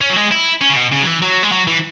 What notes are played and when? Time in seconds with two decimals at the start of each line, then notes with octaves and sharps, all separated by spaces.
0.01 C#4
0.10 F#3
0.16 G#3
0.31 E4
0.62 C#4
0.70 C#3
0.76 B2
0.92 C#3
1.02 F#3
1.07 E3
1.22 F#3
1.43 G#3
1.52 F#3
1.67 E3